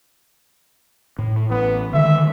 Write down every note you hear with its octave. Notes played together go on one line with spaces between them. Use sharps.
A2
A1 B3
D3 D#3 G#3 E5